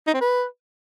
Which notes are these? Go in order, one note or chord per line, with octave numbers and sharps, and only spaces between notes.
D#4
C4
B4